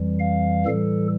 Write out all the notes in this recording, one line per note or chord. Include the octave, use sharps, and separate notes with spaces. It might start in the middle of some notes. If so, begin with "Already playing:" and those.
Already playing: F2 E3 G3
F5
A2 E3 G3 A4